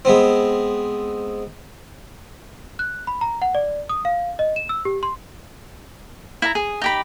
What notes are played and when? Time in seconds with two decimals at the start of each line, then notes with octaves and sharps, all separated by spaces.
0.05 G#3 B3 C4
2.79 F#6
3.07 B5
3.21 A#5
3.42 F#5
3.55 D5
3.89 D#6
4.05 F5
4.39 D#5
4.56 E7
4.69 E6
4.85 G4
5.03 C6
6.42 E4 F5 A#5
6.55 G#4
6.82 D#4 G4 B5